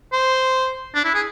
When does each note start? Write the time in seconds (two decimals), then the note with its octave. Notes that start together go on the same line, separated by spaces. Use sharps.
0.13 C5
0.95 D4
1.04 E4
1.14 G#4